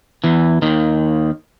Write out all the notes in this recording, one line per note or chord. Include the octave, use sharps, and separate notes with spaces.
E2 E3
D#2 D#3